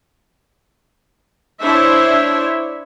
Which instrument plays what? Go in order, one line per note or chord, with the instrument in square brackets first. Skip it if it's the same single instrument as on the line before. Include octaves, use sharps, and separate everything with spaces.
[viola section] D4 E4 C5 C#5 E5